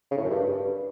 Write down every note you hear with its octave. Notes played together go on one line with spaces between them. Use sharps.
C#3
A2
F#2
G2